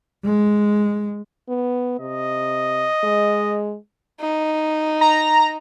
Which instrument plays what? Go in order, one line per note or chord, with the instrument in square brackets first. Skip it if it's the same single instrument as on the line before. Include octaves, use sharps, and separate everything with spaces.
[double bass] G#3
[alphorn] B3
[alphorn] C3 [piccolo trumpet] D#5
[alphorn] G#3
[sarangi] D#4
[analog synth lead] A#5